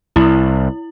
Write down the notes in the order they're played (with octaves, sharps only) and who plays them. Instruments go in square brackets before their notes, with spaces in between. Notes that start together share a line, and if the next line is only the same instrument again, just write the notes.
[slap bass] C2 [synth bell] E4